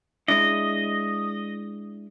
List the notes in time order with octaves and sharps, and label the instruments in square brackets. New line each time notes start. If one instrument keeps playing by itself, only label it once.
[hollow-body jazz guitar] G#3 D4 E4 [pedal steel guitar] D#5